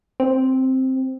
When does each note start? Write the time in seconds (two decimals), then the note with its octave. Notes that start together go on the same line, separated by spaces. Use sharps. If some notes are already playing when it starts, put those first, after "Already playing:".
0.20 C4